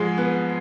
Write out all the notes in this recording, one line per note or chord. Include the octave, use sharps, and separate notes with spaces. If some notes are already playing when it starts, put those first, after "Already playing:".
Already playing: G#2 F3 G#3
B3